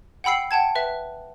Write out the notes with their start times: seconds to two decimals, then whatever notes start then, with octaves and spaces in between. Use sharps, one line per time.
0.24 F#5 G5 B5 E6 C7
0.51 F#5 G5 A5 G#6
0.75 B4 E5